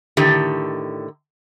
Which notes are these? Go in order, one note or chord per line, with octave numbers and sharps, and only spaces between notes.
A2 D3 D#3 G4